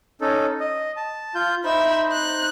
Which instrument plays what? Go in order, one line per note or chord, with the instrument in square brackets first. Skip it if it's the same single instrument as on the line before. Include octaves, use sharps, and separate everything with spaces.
[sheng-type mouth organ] C#4 D#4 A4
D#5
A5
F4 G6
[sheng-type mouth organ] D#4 C5 [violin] E5 B5
[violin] F#6